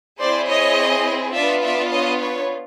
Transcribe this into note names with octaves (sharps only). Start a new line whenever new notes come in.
C4 E4 G#4 C5 D5
C#5 D#5
B3 D4 F4 D5 E5
D5 E5
C#5 D#5
B4 C#5